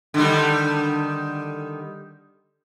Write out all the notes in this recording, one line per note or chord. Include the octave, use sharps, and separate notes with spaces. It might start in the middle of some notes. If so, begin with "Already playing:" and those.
D3 D#3 G3